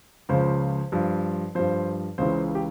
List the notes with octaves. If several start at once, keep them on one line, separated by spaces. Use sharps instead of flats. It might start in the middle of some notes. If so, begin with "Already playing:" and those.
C#2 C#3 F3 C5
G2 F3
G2 F3 C5
C#2 C#3 E3 C5
G4